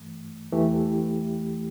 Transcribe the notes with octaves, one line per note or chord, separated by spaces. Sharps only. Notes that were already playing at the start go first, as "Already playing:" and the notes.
Already playing: G2 E3 A3
E2 E3 A3 G4